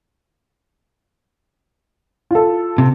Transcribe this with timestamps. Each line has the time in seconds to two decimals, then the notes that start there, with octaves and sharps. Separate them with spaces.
2.31 F4 A4
2.78 C3